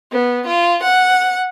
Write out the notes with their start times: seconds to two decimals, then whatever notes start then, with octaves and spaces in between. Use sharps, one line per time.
0.13 B3
0.47 F4
0.83 F#5